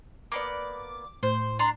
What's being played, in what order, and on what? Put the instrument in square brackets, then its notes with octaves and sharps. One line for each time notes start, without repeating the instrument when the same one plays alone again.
[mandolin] A#3 B3 D5 [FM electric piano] D6
[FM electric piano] A2 [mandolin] C5
[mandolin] D4 A#5 C6